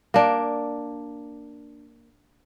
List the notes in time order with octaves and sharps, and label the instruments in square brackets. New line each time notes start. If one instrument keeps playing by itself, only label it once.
[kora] A#3 D4